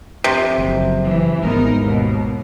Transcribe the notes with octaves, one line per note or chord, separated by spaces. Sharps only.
F2 C3
F#1
E3
G#1 G#3 B3 D#4 A#4
D#2 B2